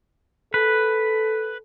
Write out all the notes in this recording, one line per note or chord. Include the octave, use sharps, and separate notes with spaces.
A4 B4